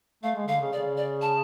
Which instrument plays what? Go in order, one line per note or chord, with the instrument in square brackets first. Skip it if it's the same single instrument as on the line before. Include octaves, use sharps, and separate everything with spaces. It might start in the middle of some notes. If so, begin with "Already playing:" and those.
[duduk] A3 [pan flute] F5
[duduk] G#3
[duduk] D3 [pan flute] F5
[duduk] C#3
[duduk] C#3 [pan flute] D5
[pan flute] D5
A5